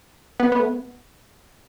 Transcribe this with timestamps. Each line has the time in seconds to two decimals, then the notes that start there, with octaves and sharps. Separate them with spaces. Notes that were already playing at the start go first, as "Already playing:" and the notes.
0.40 B3
0.52 B3
0.60 A3
0.65 B3